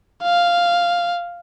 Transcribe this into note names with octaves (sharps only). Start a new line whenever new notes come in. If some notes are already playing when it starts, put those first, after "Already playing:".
F5